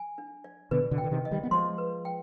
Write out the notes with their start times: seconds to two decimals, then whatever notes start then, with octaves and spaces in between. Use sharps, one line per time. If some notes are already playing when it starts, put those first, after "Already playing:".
Already playing: G#5
0.18 D4
0.44 D5
0.71 B2 D3 B4
0.91 B2 D3
0.98 G5
1.04 D3
1.11 C3 D#3
1.25 D#5
1.31 D#3 G3
1.43 B3
1.51 F3 G#3 C6
1.78 B4
2.05 G5